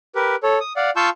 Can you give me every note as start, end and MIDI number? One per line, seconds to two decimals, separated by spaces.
0.15 0.36 67
0.15 0.36 70
0.15 0.36 71
0.43 0.59 69
0.43 0.59 73
0.61 0.73 87
0.76 0.90 74
0.76 0.90 77
0.76 0.90 78
0.96 1.10 65
0.96 1.10 77
0.96 1.10 81
0.96 1.10 85
0.96 1.10 88
0.96 1.10 91